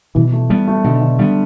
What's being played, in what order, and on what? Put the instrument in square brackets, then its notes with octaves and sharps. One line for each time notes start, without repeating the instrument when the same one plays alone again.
[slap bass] B2 [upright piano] E3
[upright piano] A3
[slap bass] G3 B3 [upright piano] A3
[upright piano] A3
[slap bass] B2 [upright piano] D3
[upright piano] D3
[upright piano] D3 [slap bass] G3 B3